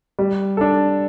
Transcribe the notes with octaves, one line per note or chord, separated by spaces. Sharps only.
G3
D4 A4